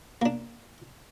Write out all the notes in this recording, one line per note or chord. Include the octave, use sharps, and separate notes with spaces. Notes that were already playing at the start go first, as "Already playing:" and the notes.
A#3 D4